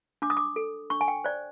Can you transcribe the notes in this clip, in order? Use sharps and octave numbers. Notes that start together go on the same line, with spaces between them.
D4 D6
D#6
D6
A4
D4 C#6
G#5
G5
C5 D5